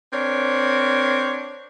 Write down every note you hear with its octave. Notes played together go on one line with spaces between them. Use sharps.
C4 D4 A#4 C#5